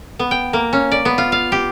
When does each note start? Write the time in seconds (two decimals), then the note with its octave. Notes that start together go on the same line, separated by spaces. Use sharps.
0.19 B3
0.31 G5
0.53 A#3
0.73 C#4
0.92 D5
1.05 B3
1.18 F4
1.32 F5
1.52 G4